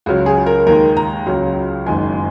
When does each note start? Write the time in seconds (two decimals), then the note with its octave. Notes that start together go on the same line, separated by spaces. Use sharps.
0.06 C#2 C#3 F#3 F#4
0.26 G#4
0.46 A#4
0.66 D#2 D#3 G#3 A#4
0.97 A#5
1.27 C#2 C#3 F#3
1.86 F#1 F#2 D#3 G#3 G#5